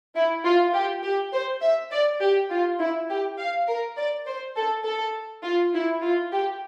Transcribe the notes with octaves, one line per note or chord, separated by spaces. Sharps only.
E4
F4
G4
G4
C5
E5
D5
G4
F4
E4
G4
F5
A#4
D5
C5
A4
A4
F4
E4
F4
G4